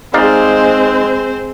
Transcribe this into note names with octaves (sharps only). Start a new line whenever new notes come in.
G#3 C4 D#4 C5 D5 F5